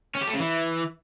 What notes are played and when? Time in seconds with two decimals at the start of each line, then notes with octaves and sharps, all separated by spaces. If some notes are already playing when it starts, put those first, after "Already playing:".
0.15 C#4
0.21 G4
0.28 A3
0.34 C#3
0.40 E3